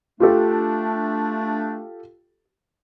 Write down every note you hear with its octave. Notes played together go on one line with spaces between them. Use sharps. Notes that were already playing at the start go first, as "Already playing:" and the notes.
A3 D4 F4 G4 A4